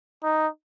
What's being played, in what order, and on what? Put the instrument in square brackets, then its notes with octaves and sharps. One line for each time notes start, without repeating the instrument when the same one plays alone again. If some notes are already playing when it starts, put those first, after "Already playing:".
[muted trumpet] D#4